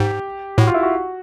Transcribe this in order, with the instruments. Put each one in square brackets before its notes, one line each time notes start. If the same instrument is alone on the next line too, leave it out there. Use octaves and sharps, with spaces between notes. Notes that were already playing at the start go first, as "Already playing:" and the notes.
Already playing: [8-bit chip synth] G#2 [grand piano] G4
[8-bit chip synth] A2 [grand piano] F#4
[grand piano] F4
E4
F#4